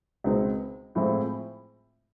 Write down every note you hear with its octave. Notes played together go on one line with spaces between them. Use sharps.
C#2 B2 G#3 C4 D#4
A2 F3 G#3 C4 E4